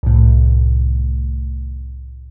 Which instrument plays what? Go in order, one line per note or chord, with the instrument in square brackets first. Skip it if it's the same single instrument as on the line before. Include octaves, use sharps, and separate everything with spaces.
[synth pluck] C2 A2